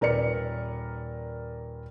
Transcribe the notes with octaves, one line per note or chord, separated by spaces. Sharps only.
D#1 A#4 B4 D5 F6 C#7